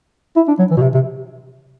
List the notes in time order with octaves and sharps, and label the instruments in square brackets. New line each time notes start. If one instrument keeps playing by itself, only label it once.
[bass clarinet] E4
D4
F#3
E3
B2
C3
C3